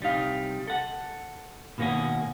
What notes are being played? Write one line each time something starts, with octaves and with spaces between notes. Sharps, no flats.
C2 G3 D#4 F5
A4 F#5
B2 D#3 A#3 C#4 F#4